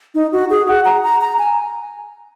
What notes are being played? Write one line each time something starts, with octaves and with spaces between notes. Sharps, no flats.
D#4
F#4
G#4
F#5
A#5
A#5
A#5
G#5